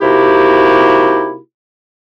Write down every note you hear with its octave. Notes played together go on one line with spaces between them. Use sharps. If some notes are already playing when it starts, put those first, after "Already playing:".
C3 A#3 D#4 E4 F#4 G4